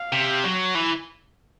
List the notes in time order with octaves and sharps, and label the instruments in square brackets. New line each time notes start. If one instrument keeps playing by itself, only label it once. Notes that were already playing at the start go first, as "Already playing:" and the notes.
Already playing: [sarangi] F5
[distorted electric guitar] C3
F#3
E3